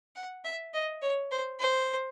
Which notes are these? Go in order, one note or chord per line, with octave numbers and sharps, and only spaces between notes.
F#5
E5
D#5
C#5
C5
C5